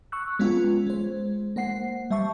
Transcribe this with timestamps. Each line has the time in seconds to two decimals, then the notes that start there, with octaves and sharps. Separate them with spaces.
0.12 C#6 E6 F#6
0.39 G#3 B3 C#4 F4
0.87 G#3 C5
1.56 A#3 C5 F#5 C7
2.11 G3 E5 A5 C#6